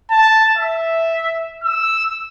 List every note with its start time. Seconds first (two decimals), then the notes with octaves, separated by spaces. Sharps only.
0.11 A5
0.58 E5
1.64 E6